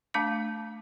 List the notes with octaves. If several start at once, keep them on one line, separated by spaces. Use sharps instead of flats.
A3 D4 F5 A5 D6